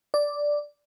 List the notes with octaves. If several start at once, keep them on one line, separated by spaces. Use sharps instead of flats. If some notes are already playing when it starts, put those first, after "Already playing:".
D5